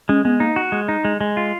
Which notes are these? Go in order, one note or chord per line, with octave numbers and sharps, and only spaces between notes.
G#3 C#4
G#3 B3
A#3 D#4
F#4
G#3
D#4
G#3
G#3
F4